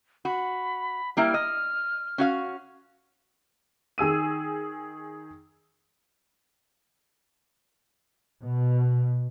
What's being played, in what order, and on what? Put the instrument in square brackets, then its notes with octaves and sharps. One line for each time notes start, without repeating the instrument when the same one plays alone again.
[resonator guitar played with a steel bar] F#4 [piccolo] B5
[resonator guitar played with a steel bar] G3 A#3 E4 [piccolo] F6
[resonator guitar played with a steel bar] D#5
C#4 F#4 F5
[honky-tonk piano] D#3 G#4 E6 D#7
[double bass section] B2